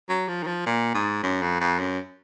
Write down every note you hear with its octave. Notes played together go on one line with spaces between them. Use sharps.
F#3
F3
D#3
F3
A#2
G#2
F#2
F2
F2
F#2